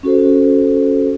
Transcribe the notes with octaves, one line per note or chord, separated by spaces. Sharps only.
C#4 F#4 A4 C5